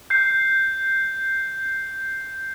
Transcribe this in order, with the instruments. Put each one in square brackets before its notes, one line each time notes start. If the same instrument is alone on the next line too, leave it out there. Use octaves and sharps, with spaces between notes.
[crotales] G6 C7